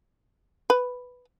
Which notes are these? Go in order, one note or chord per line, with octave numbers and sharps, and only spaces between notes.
B4